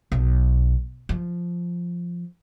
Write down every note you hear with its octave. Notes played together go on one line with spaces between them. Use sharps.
B1
F3